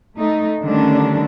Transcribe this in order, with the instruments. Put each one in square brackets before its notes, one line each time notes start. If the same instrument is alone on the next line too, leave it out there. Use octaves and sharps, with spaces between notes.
[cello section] A3 D#4
D3 D#3 G3 A3 C#4 D4